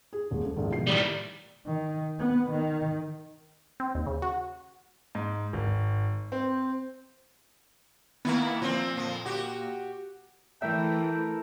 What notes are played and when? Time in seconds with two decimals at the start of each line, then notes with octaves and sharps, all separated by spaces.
0.13 G#4
0.31 D#1 G#3
0.44 C#3 A4
0.56 A#1 G#2 D#3
0.71 B2 F3 C7
0.87 A2 D#3 G3 D5 D#6
1.66 D#3
2.19 B3
2.51 D#3
3.80 C4
3.95 D#2
4.06 C#3
4.22 F#4
5.15 G#2
5.53 G#1
6.32 C4
8.25 D#3 A#3 B3 E4
8.62 A#2 F3 C4
8.97 F2 F3
9.25 F#4 G4
10.62 E3 A3 E4 A4 A#4 E5 G5